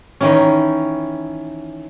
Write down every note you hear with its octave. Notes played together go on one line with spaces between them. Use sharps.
D#3 E3 C#4